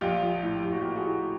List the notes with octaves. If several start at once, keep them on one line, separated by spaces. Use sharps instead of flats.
A#1 F4 G4
F3
A2
A#1 G4
F#4
A#3 F4 G4
F#4 G#4
A2